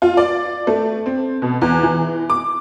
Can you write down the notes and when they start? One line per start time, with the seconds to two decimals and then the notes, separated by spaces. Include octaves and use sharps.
0.02 F4
0.17 D5
0.67 A3
1.06 C4
1.42 B2
1.62 E2
1.83 E3
2.30 D6